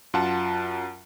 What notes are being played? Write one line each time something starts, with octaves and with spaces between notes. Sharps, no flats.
F#2 F4 F#5 A5